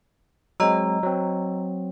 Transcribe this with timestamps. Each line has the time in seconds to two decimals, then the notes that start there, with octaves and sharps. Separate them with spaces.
0.60 F#3 G#3 C4 D#5 A#5 E6
1.03 F#3 C4